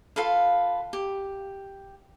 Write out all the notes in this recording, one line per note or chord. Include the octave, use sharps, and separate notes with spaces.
F4 A4 B4 F5
G4